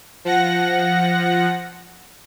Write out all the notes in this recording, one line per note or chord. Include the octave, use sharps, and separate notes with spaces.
F3 F#5 A#6